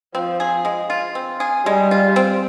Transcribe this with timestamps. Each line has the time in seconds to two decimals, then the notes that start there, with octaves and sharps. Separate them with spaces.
0.15 F3 C4
0.40 G#4
0.65 G#3
0.90 F4
1.15 C4
1.40 G#4
1.66 G3 G#3
1.91 F4
2.16 C4